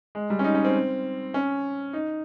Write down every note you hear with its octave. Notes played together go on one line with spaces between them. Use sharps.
G#3
G3
C#4
D#4
C#4
C4
C#4
D#4